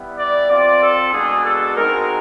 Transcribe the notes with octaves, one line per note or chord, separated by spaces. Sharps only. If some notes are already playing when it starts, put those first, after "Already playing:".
Already playing: G3 B3 E4
D5
C4 F4 D5
A4
G#3 B3 D4 F#4 G#4
A4
G#3 C4 D#4 F#4 A#4